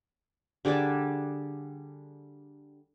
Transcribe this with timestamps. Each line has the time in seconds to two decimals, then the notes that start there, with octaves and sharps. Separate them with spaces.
0.65 D3 G3 G#4 D5